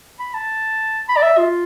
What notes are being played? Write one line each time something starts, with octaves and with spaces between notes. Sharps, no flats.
B5
A5
B5
D5
E5
F4